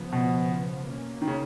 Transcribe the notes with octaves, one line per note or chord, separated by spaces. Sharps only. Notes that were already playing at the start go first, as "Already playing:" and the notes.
Already playing: C#3 F3 B3
B2
B2 A#3 C#4
D#3
C#3